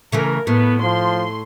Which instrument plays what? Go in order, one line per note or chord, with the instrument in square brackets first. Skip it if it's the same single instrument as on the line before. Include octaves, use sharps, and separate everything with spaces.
[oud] C#3 E3 A3 [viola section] A#4
[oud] A2 [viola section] B3
[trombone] F3 [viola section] C6